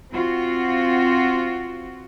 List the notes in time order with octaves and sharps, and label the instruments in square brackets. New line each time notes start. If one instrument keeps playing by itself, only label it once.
[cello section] C4 F4 F#4